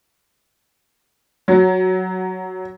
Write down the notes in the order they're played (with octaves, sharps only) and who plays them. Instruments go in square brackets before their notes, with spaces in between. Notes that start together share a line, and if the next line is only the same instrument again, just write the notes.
[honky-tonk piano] F#3